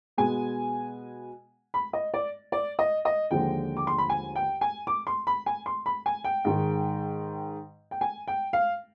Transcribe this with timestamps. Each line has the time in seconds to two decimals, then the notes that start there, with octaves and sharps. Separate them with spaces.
0.18 B2 G#3 B3 G#5
1.74 B5
1.93 D#5
2.14 D5
2.52 D5
2.79 D#5
3.05 D#5
3.31 D#2 D3 F3 G#3 G5
3.77 D6
3.87 C6
3.98 B5
4.10 G#5
4.36 G5
4.61 G#5
4.87 D6
5.07 C6
5.27 B5
5.46 G#5
5.66 C6
5.86 B5
6.06 G#5
6.24 G5
6.45 G#2 D#3 G#3
7.91 G5
8.01 G#5
8.28 G5
8.53 F5